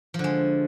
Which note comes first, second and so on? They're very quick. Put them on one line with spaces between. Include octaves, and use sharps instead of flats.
F3 D3 G#3